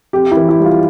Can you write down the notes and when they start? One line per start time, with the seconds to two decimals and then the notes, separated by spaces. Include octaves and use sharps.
0.13 F2 G4
0.31 E4
0.37 E3
0.49 E4
0.60 G3
0.65 F4